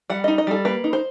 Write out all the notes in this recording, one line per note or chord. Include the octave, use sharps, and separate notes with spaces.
G3 F#5
D#4 D#5
D#5
G3 A4
A#3 B4
D#4
C5